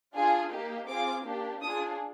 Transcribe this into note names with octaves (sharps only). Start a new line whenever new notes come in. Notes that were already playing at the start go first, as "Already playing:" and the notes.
D4 F4 G#4
A#3 D#4 G4
C4 F4 G#4 D6
A#3 D4 G4
D4 F4 G#4 D#6